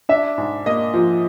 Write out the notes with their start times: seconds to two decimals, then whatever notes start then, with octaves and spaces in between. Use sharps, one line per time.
0.09 D4 E5
0.38 G#2
0.66 A#3 D#5
0.94 F3